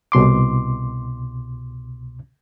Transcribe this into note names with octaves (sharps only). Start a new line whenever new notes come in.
C2 B2 C6 D6